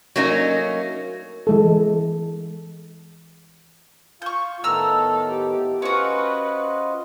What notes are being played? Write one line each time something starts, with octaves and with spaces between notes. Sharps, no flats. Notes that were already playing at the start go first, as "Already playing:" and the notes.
F#3 A3 A#3 C#4 D#4
E3 G#3 A4
F4 F5 C#6 G6
A2 D#3 B3 A4 A#5 E6 F6
G4
C#4 F4 F#4 B4 C5 D#5